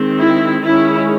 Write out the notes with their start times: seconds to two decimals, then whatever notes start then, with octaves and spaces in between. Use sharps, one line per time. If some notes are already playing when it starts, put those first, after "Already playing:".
Already playing: D#3 G#3 C4
0.18 E4
0.65 D#3 G#3 C#4 E4